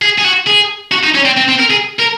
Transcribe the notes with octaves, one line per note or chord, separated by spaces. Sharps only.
G#4
G#4
F#4
G#4
F#4
D#4
C#4
C4
C4
C4
A#4
G#4
A#4